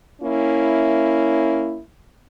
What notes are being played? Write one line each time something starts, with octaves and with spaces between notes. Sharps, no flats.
A#3 C#4 E4